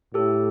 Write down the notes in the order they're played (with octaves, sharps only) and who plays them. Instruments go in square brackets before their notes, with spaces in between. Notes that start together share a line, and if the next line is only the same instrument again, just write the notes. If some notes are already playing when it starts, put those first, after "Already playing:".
[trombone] A2 [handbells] G4 A4